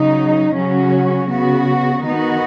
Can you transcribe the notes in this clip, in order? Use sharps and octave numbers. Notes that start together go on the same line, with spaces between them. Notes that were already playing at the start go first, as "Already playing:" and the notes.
Already playing: C#3 F#3 D#4
C#3 F#3 C#4 F#4
C#3 B3 F#4
D#3 B3 D#4 F#4